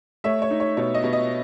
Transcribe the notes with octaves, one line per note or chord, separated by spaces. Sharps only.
A3 C#5 E5
C#5
D#4
C#5
B2 C#5
D#5
B2
D#5